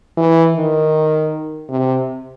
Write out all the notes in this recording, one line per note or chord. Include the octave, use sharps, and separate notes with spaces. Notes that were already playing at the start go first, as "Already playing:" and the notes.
E3
D#3
C3